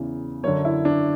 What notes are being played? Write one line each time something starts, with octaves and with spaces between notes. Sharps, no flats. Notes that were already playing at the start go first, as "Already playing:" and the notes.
Already playing: E2 C#3 E3
F#2 D3 C#5
E4
D4